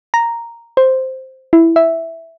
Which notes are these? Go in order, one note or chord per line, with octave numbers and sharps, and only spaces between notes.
A#5
C5
E4
E5